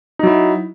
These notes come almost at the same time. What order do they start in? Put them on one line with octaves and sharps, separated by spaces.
D#4 F#3 E4